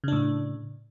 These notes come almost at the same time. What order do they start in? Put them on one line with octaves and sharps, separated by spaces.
C#3 D4 A2